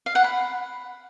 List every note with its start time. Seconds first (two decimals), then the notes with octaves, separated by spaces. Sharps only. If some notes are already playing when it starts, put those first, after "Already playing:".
0.06 F5
0.15 F#5
0.24 B5